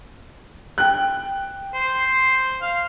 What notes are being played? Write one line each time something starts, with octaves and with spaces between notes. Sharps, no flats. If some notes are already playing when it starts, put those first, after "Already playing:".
G5 F#6
C5
F5